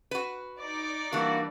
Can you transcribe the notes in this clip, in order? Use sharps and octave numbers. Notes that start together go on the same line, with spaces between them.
F#4 B4
D#4 D5
E3 G3 A#3 D4 F#4